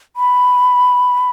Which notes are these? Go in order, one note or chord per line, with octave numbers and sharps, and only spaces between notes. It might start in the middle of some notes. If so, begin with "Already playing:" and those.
B5